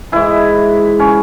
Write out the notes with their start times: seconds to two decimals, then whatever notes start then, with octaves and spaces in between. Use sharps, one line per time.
0.12 G#2 E3 E4
1.00 C#4